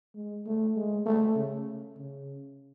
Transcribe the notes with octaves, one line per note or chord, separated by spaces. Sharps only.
G#3
A3
G#3
A3
C#3
C#3